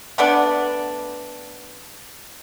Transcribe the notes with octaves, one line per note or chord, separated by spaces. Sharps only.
A3 B3 D4